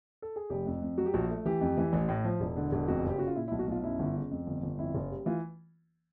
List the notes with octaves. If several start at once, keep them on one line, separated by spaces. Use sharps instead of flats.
A4
G#4
F1 G4
F2
F2
F#3 F#4
G4
A#1 F#4
A3
E3 G4
F2
E3
A1
A2
F3
E1
D3
E1
F2 F#4
F#1
G4
C#3 F#4
F4
A#2 E4
E4
B1
F#4
B1 F4
F#2 E4
G1
C#3
F2
G1
G1
F2 E4
F#1
G3
E3 F4